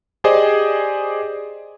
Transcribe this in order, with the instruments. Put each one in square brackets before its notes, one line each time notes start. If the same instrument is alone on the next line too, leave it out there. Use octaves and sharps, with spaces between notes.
[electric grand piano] G4 G#4 C5 D5 D#5 G#5